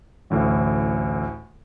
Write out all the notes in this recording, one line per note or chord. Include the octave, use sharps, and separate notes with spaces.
A1 D2 A2